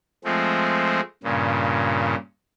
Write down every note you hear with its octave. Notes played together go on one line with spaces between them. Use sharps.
F3 G#3 A3 C4
G2 A#2 C#3